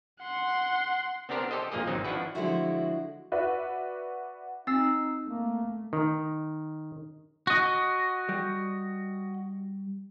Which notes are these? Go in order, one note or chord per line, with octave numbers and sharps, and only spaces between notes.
F#5 C6
B3 C4 D4 G4 A#4 C5
G4 A4 C5 D#5
G2 A#2 F3 A#3 G#4 D#5
G#1 F#3 C4 D#4 D#5
F3 D4 E4 F#4 B4
D3 F3 G#3 A3 E4 F#4
F#4 B4 D5 E5
C4 D#4 E6 A#6 C7
A3 A#3
D#3
F#4 D#5
G3